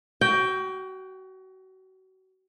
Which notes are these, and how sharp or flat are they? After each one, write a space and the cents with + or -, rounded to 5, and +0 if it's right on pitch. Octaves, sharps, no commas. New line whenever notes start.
F#4 +30 G5 +0